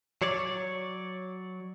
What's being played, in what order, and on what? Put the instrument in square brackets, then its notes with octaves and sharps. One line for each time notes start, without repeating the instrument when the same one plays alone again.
[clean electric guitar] F#3 C#5 D5